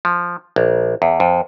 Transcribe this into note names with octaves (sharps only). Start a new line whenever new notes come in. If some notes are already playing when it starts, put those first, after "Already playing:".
F3
A#1
E2
F2